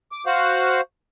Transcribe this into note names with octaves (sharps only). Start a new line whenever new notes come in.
D6
F#4 C5 F5 F#5